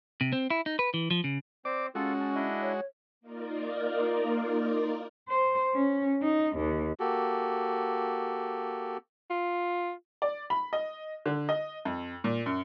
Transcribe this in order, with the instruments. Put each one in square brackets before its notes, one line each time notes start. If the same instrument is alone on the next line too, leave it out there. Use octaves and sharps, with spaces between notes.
[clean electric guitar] C3
C4
E4
D#4
B4
E3
F3
C#3
[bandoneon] C4 C5 [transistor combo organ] D5 D6
[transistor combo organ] G#3 F#4 [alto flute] C#4 [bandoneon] F4 A4
[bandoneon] A5
D4 E4 D#5
[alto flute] C#5
[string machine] A#3 D#4 F4 A#4 D5
[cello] C5
C#4
D#4
D#2
[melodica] A#3 F#4 G4 A4
[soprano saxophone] F4
[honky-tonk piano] D5
B5
D#5
D3
D#5
F2
A#2
F#2